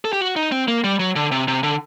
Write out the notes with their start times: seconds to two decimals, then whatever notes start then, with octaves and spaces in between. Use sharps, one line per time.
0.05 A4
0.13 G4
0.21 F#4
0.36 D#4
0.52 C4
0.68 A#3
0.84 G3
1.00 F#3
1.16 D3
1.31 C3
1.48 C3
1.63 D3